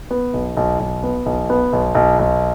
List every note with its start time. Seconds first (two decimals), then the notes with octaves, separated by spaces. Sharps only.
0.11 B3
0.33 B1
0.57 B1
0.79 B1
1.03 B3
1.26 B1
1.50 B3
1.73 B1
1.95 B1
2.19 B1